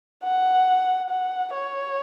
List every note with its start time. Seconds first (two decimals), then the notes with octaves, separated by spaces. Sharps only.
0.24 F#5
1.10 F#5
1.54 C#5